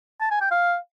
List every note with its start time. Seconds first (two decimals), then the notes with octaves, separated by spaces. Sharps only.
0.21 A5
0.31 G#5
0.41 G5
0.51 F5